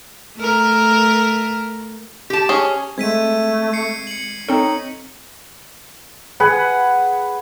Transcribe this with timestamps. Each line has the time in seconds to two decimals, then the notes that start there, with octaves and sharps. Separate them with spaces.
0.37 A3 A#4
2.30 G4 A5
2.49 C#4 G#4
2.98 G#3 A3 C4 G#6 B6 D#7
3.73 C7 C#7
4.07 C#7 F#7
4.49 C4 D#4 A4 C#5
6.40 G#4 B4 F#5